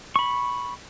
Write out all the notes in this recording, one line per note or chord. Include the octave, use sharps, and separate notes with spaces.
B5 C#6